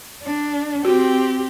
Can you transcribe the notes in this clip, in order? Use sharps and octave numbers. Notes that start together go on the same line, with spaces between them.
D4
C4 F#4 G4